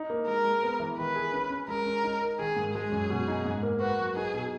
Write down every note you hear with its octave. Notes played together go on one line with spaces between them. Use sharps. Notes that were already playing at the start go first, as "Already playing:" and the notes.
Already playing: D#4
A#3
G#3 A#4
G#3
B3
E3
D#3 B4
G#4
C#4
C#4
G#3 A#4
C#4
D#4
A#4
D#3 G#4
G#2
G#3 G#4
F#2
B2
D#4
G#2
A#3
F#4 B4
F#3
D#4 G#4
B2